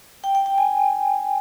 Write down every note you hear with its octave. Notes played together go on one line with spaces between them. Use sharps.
G5
G5
G5
G#5